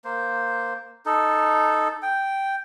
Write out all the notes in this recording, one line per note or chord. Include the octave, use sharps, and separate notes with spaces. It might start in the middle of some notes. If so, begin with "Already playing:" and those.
A#3 C5
D#4 A4
G5